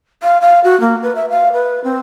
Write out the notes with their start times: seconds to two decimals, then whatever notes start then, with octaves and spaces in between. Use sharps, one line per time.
0.23 F5
0.41 F5
0.64 F#4
0.80 A#3
1.02 B4
1.15 E5
1.30 F5
1.53 B4
1.84 C4